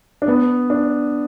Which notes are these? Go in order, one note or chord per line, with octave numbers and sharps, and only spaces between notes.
D4
B3
D4